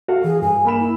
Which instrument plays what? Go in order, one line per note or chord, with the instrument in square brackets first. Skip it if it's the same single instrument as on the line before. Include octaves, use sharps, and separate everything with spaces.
[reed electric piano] F#4 A4 [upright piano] F5
[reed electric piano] E3 [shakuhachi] G#4
[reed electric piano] G2 [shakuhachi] G#5
[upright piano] A#3 B5 E7
[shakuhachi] E4